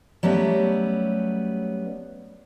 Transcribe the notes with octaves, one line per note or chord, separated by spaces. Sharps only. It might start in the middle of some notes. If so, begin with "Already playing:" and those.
F#3 G3 A3 B3 C#4